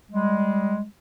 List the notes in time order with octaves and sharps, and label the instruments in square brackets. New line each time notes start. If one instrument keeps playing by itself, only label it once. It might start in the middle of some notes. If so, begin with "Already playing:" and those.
[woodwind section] G3 G#3